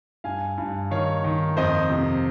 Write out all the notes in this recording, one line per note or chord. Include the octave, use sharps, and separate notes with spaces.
G2 F5 G#5
G2
D#3 C#5 F5
D#3
F2 C5 D#5
C3